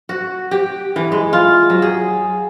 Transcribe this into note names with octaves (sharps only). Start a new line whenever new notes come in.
F#4
G4
E3
G#3
F4
F#3
G#4